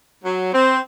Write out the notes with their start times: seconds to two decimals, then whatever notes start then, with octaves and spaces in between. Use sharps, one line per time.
0.24 F#3
0.53 C4